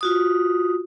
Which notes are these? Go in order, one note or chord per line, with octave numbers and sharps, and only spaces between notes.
F4 F#4 D#6